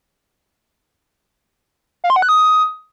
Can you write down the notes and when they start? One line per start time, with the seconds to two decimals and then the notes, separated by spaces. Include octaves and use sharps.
2.04 F5
2.10 C6
2.16 F#5
2.22 F#6
2.29 D#6